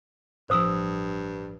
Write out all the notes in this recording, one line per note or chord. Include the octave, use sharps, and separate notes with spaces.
A1 G2 F3 C5 D#6 E6